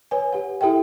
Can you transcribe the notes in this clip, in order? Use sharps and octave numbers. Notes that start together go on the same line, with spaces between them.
B4 C#5 G#5
G4 B4 F#5
E4 G4 A4 E5 G5